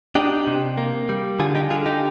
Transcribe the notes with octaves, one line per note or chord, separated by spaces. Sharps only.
D4 D#4 G4
C3
A#3
G3
D3 F4 G#4
D#4 G4
D3 F4 G#4
D#4 G4